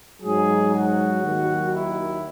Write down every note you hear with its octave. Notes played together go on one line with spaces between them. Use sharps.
G#2 F#3 G#4
F#4
D#2 D#3 F#3
E4